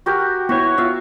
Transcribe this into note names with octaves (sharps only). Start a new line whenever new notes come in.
F#4 G4 A#4
B3 E4 F#4 C#5
F4 F#4 E5 F5